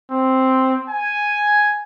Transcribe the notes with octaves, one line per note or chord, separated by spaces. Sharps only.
C4
G#5